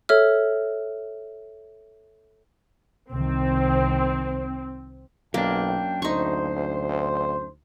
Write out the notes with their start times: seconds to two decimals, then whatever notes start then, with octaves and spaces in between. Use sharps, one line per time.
0.09 A4 C#5 E5 F6
3.11 C2 D#3 C4
5.34 B1 F#2 A#3 D4 G5
6.02 D2 D#4 C5 C#6